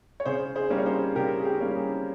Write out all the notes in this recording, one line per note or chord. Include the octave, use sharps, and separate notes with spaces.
C#5
C#3 G#4 C5
G#4 C5
G3 A#3 C#4
C#5
G#4 C5
C#3 G4 A#4
G#4
G4
G3 A#3 C#4
G#4